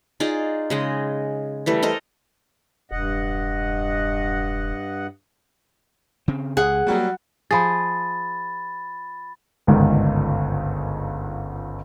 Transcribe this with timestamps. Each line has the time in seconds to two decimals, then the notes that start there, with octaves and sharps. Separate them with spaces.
0.20 D#4 F4 G#4 D5
0.70 C#3 G#3 D#5
1.66 E3 G3 A3
1.83 A4 A#4 C5 D#5
2.91 E1 G2 D#5 F#5
6.28 C#3 C4
6.57 C#2 G#4 F#5
6.87 F#3 G3 A3 A#3 F#4
7.51 F3 G#4 B5 A6
9.67 G1 C#2 G#2 D3 D#3